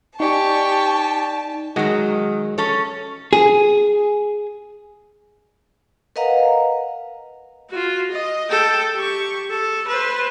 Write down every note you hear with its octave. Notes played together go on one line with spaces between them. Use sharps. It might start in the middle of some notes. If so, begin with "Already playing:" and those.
D#4 G4 D5 G#5 A5 C#6
D#3 F#3 G#3 F#4
C#4 A4 C#5
G#4
A#4 B4 D#5 F5 F#5 A#5
F4 F#4
D#5
A4 G5
G4 C#6
A4
B4 C5